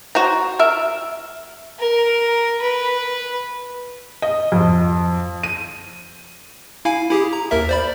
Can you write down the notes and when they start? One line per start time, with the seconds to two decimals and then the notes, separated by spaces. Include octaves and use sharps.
0.15 F#4 C5 A#5
0.59 A#4 E5
1.79 A#4
2.61 B4
4.22 D#5
4.52 F2
5.43 D#7
6.85 E4 F5 G#5
7.10 E4 G4 G#4
7.33 A#5
7.51 D#2 A#4 E5
7.69 C5 D5 B5